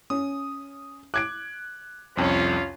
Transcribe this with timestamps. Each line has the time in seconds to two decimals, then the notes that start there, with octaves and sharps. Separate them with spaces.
0.10 C#4 D#6
1.14 D6 F#6 G#6 D7
2.17 C2 F2 C#4 F4